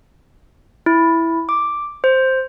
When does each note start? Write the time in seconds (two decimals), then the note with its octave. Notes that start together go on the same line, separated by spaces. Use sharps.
0.86 E4
1.49 D6
2.04 C5